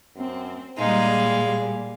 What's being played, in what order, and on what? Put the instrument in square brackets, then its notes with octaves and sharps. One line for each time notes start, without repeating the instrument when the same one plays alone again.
[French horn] F#2 [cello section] C4
[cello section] A#2 G3 [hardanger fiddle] G#3 F5 [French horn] D#4
[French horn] G#4